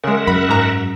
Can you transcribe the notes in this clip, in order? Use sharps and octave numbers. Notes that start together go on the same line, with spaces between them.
C#3 G#3 A#4 E5 F#5
F#2 B5
G#2 A#5